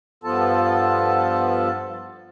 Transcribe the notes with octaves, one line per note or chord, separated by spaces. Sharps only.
G2 F3 B3 F4 A4 A5